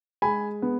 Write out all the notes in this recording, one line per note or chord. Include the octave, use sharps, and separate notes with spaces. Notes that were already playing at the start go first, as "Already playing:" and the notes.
G#3 G#5 B5
B3